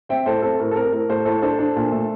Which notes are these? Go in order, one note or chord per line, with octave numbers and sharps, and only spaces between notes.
C4 E5 G5
A2 A4 C5
C4 A4
A2 A#4
A4
C4 A#4
A2 A#4
A2 A4 C5
A2 A4 C5
D4 A4 C5
D4
A#2
A3